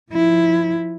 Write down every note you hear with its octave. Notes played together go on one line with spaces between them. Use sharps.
F3 E4